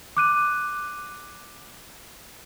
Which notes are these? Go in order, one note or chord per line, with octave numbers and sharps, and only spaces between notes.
D6 F#6 D#7